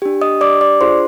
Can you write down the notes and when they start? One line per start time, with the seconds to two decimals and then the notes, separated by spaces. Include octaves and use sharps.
0.02 D4 G4
0.21 D#5 D#6
0.41 D5 D6
0.61 D5 D6
0.81 D4 F4 G#4 C5 C6